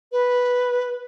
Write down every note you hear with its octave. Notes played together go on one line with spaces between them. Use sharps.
B4